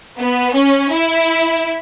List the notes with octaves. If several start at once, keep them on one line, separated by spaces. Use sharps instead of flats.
B3
C#4
E4